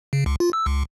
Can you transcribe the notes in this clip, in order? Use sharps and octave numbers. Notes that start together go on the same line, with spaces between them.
C#3
C#2
F4
E6
C#2